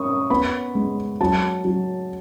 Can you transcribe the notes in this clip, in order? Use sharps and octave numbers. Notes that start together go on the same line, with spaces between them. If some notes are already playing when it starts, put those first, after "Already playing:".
Already playing: C#4 C#6 D#6
B3 B5
G#3
F#3 A5
F#3